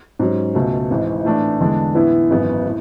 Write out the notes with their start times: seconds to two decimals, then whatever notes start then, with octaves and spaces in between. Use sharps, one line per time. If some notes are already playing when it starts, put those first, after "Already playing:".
0.19 G#2 F#3 C#4
0.55 C#2 B2 A3
0.90 G#1 G#2 E3
1.25 A2 E3 A3 D4
1.60 E2 D3 G#3 D4
1.94 A2 E3 B3 E4
2.30 G#1 F#2 E3 B3
2.66 A2